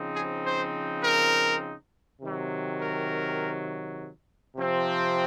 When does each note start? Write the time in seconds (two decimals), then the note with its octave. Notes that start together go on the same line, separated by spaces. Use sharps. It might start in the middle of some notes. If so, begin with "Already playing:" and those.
Already playing: C#3 F3 C4 D#4
0.14 G#4
0.44 C5
1.03 A#4
2.20 C3 D#3 F#3
2.80 A#4
4.56 C3 F3 C4